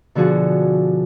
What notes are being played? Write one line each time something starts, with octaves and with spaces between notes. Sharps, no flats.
B2 D3 F3 F#4 G#4